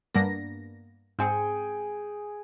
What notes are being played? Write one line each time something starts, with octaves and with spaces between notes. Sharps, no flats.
G2 A#3 B3 D4 A#6
G#2 C4 G#4 G5 G#5 C#7